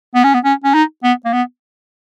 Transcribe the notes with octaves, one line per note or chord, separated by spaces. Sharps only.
B3
C#4
B3
C#4
C#4
D#4
B3
A#3
B3